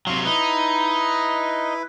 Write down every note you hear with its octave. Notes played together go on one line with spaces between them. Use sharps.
C3 F#3 F5 C6 C#6
D#4 E4 B4